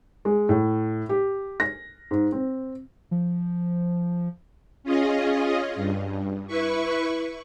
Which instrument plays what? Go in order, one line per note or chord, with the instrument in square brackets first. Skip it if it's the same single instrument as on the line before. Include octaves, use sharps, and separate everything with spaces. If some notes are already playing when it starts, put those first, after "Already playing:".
[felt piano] G#3
A2
G4
A#6
G#2
C4
[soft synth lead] F3
[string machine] C#4 F4 G#4 D#5
G2
E4 B4 C#6